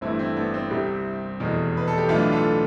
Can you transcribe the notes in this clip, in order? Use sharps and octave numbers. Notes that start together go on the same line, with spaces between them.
G1 G2 E3 A3 C4 E4
C4 E4
B3 D4
C4
C2 C3 G3
F1 E2 B2
B4
A4
G4
B1 A2 E3 A3 D4 F4
F4 A4